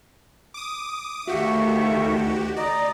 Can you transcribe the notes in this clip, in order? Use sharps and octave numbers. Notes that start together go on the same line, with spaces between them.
D6 D#6
D2 D#3 F#4 G4 E5 F5 C#6
D5 D#5 A#5